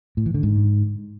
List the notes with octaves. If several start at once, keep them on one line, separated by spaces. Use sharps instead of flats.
A2
E3
D3
G#2